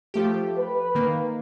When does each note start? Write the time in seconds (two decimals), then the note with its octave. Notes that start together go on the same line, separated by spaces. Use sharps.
0.14 F3 A3 G4
0.58 B4
0.95 D#3 A#3